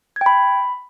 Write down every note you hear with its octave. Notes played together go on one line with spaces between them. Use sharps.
G#6
G5
B5